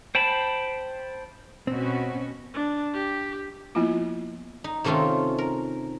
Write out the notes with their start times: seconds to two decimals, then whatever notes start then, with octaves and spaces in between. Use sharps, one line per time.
0.15 C5 G5 A5 B5
1.67 B2 C4 C#4 F#4
2.54 D4
2.94 G4
3.75 F3 A#3 B3 E4 F4
4.64 D#4
4.84 C3 D#3 A3 C#4 F4
5.38 A#4